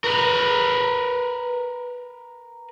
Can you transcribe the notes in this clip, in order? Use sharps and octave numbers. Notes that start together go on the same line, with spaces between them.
A#4 B4